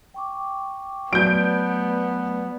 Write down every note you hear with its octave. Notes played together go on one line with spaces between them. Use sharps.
G5 C#6 D6
F#3 A3 B3 B4 D5 G6 D7